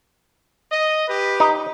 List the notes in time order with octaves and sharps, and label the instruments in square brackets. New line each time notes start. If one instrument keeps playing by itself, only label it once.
[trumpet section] D#5
G4 B4
[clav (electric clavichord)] D#4